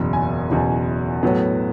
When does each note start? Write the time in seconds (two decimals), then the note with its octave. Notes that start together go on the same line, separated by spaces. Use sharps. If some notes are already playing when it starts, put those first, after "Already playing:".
Already playing: F#1 E2 B2
0.13 G#5
0.50 F#1 E2 B2
1.23 A2 F#3 B3